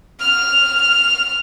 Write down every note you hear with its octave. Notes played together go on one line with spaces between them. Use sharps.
F6 F7